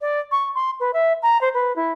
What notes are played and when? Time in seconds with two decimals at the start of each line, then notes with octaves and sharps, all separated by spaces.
0.01 D5
0.31 C#6
0.55 C6
0.80 B4
0.93 E5
1.22 A#5
1.41 C5
1.54 B4
1.76 E4